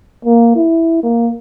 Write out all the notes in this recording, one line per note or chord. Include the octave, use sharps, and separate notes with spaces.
A#3
E4
A#3